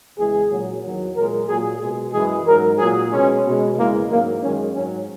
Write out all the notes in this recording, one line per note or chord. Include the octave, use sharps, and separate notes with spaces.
E2 C#3 E3 G#3 G#4
A#2 F#3
E2 D#3 F#3
A#2 G#3 A#4
A#2 F#3 G#4
B2 G#3 G#4
F#2 E3 G#3 G#4
G#2 F#3 A#4
A#2 F#3 G#4
B2 G#3 C#4
B2 G#3
E2 C#3 E3 G#3 A#3
G#2 F#3 A#3
F#2 D#3 G#3 C#4
G#2 F#3 C#4